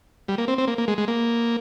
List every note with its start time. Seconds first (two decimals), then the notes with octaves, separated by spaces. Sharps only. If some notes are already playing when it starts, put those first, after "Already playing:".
0.28 G3
0.38 A#3
0.48 C4
0.58 C4
0.68 A#3
0.78 A#3
0.88 G#3
0.98 G#3
1.08 A#3